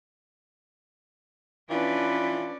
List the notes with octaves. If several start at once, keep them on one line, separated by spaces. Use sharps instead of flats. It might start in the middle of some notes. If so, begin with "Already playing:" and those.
E3 C#4 D4 F4 B4 D5